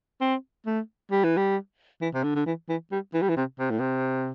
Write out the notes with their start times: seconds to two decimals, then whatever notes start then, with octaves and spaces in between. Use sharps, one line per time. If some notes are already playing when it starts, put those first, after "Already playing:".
0.21 C4
0.66 A3
1.12 G3
1.24 E3
1.37 G3
2.02 E3
2.14 C3
2.24 D3
2.36 D3
2.46 E3
2.69 E3
2.92 G3
3.14 E3
3.22 G3
3.29 E3
3.37 C3
3.60 C3
3.70 A2
3.80 C3